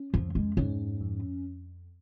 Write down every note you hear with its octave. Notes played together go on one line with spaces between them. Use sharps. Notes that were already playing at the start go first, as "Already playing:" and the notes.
Already playing: C#4
F2 F3
G#3
G#2 C#4
F2